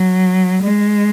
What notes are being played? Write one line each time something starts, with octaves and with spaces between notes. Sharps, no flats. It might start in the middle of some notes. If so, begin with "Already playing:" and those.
Already playing: F#3
G#3